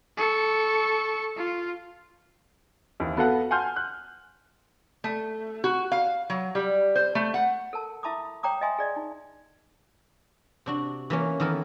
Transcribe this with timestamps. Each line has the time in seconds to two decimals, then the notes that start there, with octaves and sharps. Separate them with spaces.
0.17 A4 C#6
1.37 F4
3.00 D#2 E3
3.17 B3 F#4 A4 B4 F5 F#5
3.51 F#5 G#5 A5 C6 F6 G6
3.76 F#6
5.04 A3
5.64 F#4
5.92 F5
6.30 F#3
6.55 G3
6.95 C5
7.15 A3
7.34 F#5
7.73 A4 A#4 A5
8.03 E4 E5 A5 B5 D6 D#6
8.43 C#5 G5 A#5 D6 D#6
8.61 D#5 E5 G#5 C6 D#6
8.78 G#4 D5 D#5
8.96 D#4
10.66 C3 D4 F#4
11.10 E3 A#3 C#4
11.40 D#3 E3 B3 A4 A#4